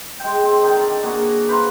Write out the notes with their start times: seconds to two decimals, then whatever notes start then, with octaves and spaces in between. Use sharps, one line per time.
0.20 G#3 G5
0.43 C4
0.63 D3 D#3 D#4
0.81 D5
1.03 A#3 F#4 G#4
1.48 B4 C5 F5 A#5